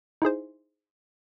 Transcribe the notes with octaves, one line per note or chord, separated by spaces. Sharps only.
D#4 E4 G#4 C5